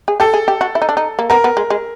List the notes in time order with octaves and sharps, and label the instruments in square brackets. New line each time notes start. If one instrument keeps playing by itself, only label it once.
[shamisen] G#4
[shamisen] G4 [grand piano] A4
[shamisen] G#4
G4
F#4
E4
D#4
D4
D#4
A#3
[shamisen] B3 [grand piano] A#4
[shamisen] B3
G#3
G#3